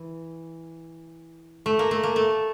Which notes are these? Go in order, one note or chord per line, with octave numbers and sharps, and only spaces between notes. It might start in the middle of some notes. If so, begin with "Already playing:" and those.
Already playing: E3
A3
A#3
A3
A#3
A3